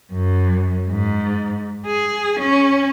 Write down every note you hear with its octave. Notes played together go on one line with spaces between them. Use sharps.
F#2
G#2
G#4
C#4